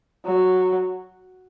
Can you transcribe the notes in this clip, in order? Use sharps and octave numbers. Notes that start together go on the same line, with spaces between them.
F#3